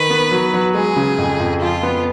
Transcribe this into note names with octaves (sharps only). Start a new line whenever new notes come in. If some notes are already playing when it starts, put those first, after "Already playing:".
Already playing: D#3 B4
B3
F#3
F#3
G#3 G#4
C#3
F2
F2
F3 F4
B3